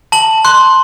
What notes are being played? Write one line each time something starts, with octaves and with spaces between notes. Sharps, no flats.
A5 F#7
C6 F#6